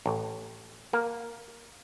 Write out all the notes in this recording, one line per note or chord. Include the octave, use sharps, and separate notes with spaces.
A1
A#3